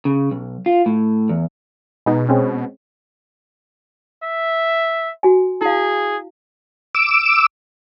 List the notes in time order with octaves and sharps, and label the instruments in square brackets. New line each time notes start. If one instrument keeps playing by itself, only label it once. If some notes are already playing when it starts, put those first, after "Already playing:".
[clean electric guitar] C#3
B1
F4
A2
E2
[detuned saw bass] B2 [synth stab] G#3 B3 D#4
[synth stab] G#3 C4 C#4
[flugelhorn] E5
[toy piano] F#4 G#5
[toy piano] E4 F5 [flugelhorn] G#4
[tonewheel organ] D6 E6